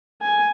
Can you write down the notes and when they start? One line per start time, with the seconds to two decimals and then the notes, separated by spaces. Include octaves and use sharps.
0.21 G#5